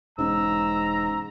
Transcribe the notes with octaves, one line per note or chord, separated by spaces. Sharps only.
E1 G#2 C#4 A#5 E6